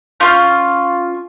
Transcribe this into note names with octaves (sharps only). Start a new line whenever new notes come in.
C#4 F4 F6 G6